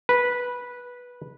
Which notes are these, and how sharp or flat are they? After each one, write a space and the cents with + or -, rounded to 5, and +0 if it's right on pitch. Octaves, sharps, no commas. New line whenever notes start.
B4 -10